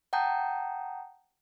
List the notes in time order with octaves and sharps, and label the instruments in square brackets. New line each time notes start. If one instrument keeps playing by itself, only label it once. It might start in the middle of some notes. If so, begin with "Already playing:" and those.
[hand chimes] F#5 G5 A5 A#5 D#6 G6